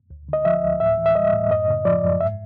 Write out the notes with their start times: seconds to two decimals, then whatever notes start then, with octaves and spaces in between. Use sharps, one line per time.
0.10 D2
0.29 D3 D#5
0.45 F3 E5
0.63 D2
0.80 A2 E5
0.98 E3
1.06 E5
1.15 G3 D#5
1.33 A2
1.51 F#2 D#5
1.68 C#3
1.85 F3 D5
2.03 F#2
2.21 G#2 E5